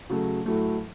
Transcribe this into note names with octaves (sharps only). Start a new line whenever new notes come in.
C#3 F#3 A3
A2 F#3 A3